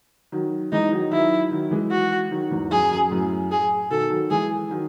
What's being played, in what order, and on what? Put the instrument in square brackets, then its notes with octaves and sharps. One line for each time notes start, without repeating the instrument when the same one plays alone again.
[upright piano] D#3 F#3
[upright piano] E3 G#3 [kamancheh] D#4
[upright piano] D#3 F#3
[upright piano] D#3 F#3 [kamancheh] E4
[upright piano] D#3 F#3
E3 G#3
[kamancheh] F#4
[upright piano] D#3 F#3
E2 G#2
[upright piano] F#2 [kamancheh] G#4
[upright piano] F#2
F#2 A2
[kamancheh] G#4
[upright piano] B2 D#3 [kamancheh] A4
[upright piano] D#3 F#3
[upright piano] E3 G#3 [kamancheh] G#4
[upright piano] D#3 F#3